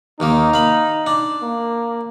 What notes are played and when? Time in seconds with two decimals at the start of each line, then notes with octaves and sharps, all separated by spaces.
0.20 D#2 D#3 A#3 D#4
0.54 F5 B5
1.07 D4
1.42 A#3